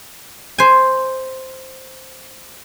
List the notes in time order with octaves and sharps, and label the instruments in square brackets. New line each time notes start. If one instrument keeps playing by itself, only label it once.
[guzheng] C5 G#5